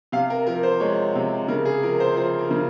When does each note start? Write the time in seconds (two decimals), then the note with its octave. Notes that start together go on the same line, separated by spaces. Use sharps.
0.12 C3 F5
0.30 A#4
0.47 F3 A#4
0.63 C5
0.80 G#3 C#5
1.15 C3
1.48 C#3 A#4
1.65 G#4
1.83 F3 A#4
2.00 C5
2.16 F3 C5
2.39 A#4
2.51 C#3